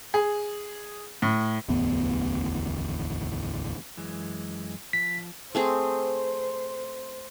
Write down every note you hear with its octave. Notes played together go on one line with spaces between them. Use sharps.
G#4
A2
D1 A1 E2 B3
F#2 E3 G#3
F3 B6
A3 C4 G#4 C5